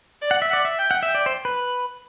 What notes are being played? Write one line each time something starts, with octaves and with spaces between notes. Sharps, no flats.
D5
F#5
E5
D5 F#5
E5
G5
F#5
E5 G5
D5
C5
B4